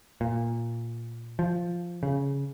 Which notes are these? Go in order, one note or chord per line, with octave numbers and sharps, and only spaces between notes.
A#2
F3
C#3